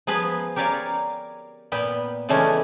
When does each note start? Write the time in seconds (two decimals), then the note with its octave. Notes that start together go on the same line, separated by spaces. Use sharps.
0.07 F3 B3 G#4 B4
0.56 G4 A#4 C#5 D5 F5 G#5
1.72 A#2 B3 G5 B5
2.29 C#3 E3 G#3 A3 C#4 D4